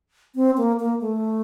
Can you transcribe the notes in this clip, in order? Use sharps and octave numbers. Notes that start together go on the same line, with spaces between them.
C4
A#3
A#3
A3